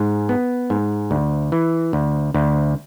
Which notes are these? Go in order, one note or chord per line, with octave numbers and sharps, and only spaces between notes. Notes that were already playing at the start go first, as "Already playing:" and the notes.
Already playing: G#2
B3
G#2
D2
E3
D2
D2